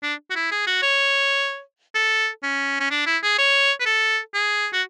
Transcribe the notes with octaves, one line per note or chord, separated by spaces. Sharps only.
D4
F#4
E4
G#4
F#4
C#5
A4
C#4
C#4
D4
E4
G#4
C#5
B4
A4
G#4
F#4